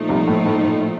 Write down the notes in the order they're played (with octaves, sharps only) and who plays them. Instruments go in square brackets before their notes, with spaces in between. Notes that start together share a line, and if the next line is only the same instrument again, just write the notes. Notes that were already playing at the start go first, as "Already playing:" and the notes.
Already playing: [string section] A#2 F3 A3 D#4
[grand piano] C2 C3
A2
A2
A2